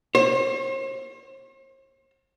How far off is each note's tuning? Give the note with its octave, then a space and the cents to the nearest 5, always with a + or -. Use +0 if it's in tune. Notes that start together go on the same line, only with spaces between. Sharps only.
C5 +45